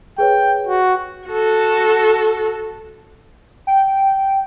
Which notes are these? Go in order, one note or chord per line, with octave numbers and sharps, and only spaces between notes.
G#4 B4 C#5 G5
F#4
F#4 A4
G5